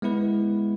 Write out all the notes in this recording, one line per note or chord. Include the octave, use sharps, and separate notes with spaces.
G#3 B3 E4 B4